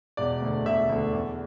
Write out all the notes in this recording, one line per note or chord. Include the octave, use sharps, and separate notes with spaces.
E1 D5
D2 D3
E1 E5
D2 D3
E2